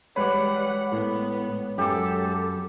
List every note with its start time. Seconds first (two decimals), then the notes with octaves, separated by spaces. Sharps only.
0.16 A1 G3 G#3 B4 C#5 F#5 D6
0.92 A2 B3
1.78 F#2 G4 A4 D6